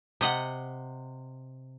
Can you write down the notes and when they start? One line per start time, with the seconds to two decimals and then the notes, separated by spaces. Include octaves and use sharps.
0.21 C3 D#5 F#5